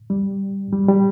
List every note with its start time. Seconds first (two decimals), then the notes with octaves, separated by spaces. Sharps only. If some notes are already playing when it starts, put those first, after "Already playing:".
0.10 G3
0.73 G3
0.88 G3